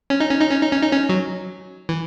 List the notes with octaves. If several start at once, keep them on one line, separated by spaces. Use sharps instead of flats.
C#4
D#4
C#4
D#4
C#4
D#4
C#4
D#4
C#4
F#3
E3